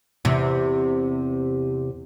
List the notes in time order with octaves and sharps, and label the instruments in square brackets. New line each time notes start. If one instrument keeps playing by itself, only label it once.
[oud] E2 C3